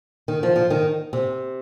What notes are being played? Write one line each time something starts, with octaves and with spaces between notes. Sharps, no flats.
D#3
F3
F3
D#3
C3